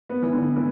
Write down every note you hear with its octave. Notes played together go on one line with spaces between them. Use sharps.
B3
E3
D3
E3